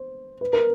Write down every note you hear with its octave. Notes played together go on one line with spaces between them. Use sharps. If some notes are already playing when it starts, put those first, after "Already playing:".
Already playing: C5
B4
A#4